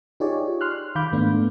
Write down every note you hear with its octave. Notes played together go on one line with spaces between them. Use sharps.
D#4 F4 G4 G#4 C#5 D5
C6 F6 F#6
D#3 F5 B5 D6 G6
G#2 A3 B3 D4